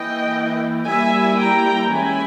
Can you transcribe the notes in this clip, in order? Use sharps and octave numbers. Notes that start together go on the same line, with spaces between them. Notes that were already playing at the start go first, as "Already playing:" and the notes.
Already playing: E3 A#3 E4 D#5 G5
G3 A#3 E4 E5 G#5
G5 A#5
E3 G#3 C#4 E4 G#5 B5